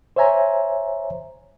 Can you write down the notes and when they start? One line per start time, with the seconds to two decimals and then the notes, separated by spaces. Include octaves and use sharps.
0.16 C5 C#5 E5 G#5 A#5